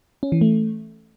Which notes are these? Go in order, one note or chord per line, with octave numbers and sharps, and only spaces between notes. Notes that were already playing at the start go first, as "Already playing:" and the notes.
C#4
E3
A3